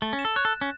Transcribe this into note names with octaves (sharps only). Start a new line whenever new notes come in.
A3 A6
C#4
E7
A4
C#5 F#6
A4
F#6
C#4